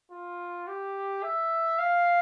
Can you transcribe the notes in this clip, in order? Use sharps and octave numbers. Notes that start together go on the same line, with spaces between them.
F4
G4
E5
F5